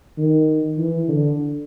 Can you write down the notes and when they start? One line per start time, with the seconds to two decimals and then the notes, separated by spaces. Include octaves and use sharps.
0.18 D#3
0.78 E3
1.08 D3